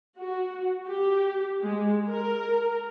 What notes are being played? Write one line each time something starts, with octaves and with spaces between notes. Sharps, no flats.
F#4
G4
G#3
A#4